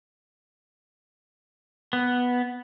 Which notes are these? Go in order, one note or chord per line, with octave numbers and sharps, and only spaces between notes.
B3